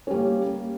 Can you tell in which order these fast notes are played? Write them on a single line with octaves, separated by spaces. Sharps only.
C#4 G3 A#3